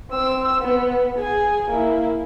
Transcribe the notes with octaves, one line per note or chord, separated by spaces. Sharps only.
C4 E6
B3
G#4 G#5
A#3 E4